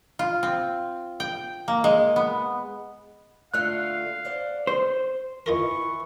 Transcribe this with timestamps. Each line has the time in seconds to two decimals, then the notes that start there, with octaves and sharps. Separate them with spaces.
0.19 F4
0.43 C4
1.20 G5
1.68 A#3
1.84 G#3
2.16 B3
3.54 D3 A3 F4 F5 F#6
4.25 C5 D5 F#5
4.67 C5
5.46 E3 D#4 F4 A#4 C#6